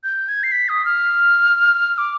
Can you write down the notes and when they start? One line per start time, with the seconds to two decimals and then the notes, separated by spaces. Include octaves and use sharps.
0.04 G6
0.29 G#6
0.43 C7
0.52 B6
0.69 D#6
0.85 F6
1.98 D6